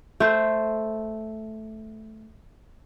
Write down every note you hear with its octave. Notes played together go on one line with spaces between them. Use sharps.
A3 C5